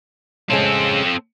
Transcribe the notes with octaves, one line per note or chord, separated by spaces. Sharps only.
A2 C#3 G#3 C4 A4